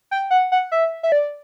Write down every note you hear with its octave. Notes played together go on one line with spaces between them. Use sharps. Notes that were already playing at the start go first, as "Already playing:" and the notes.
G5
F#5
F#5
E5
E5
D5